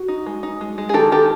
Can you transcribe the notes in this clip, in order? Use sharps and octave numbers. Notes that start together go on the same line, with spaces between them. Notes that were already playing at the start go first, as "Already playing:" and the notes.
Already playing: F#4
D#4
G#3
D#4
G#3
G#3
G#4
D#3 G4 A4
D#3 G4 A4